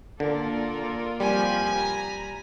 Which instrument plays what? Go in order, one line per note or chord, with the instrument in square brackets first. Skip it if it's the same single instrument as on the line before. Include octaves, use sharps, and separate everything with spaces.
[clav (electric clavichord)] D3 [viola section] A#3 F4 [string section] A4 A#4 D5
[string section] C3 F3 G4 [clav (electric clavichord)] G3 [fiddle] G#5
[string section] A#5 B5